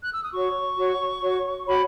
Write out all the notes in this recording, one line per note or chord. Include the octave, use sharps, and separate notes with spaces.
F#6
E6
D#6
F#4 C#5 C#6
F#4 C#5
F#4 C#5
F#4 C#5 B5